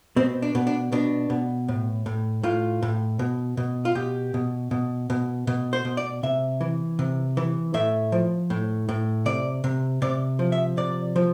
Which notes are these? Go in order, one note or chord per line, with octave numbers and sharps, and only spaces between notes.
B2 C4
D4
B2
D4
B2 D4
B2
A2
A2
A2 F4
A2
B2
B2
F4
B2 G4
B2
B2
B2
B2
C5
B2
D5
C3 E5
E3
C3
E3
A2 E5
F3
A2
A2
C3 D5
C3
C3 D5
F3
E5
C3 D5
F3